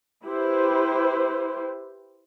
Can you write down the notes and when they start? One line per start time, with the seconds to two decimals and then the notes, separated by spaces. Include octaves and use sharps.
0.25 E4 G4 B4 C5